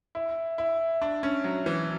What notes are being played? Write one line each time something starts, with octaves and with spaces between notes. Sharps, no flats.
E4
E4
D4
C#4
F#3
E3